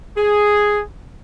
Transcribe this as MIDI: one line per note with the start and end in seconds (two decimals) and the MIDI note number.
0.17 0.80 68